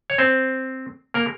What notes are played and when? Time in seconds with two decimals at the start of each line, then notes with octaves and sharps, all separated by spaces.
0.10 C#5
0.18 C4 C5
1.14 A#3 A#4